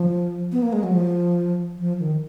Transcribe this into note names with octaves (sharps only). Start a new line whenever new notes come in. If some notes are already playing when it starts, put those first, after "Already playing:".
Already playing: F3
B3
A#3
G#3
F#3
F3
F3
D#3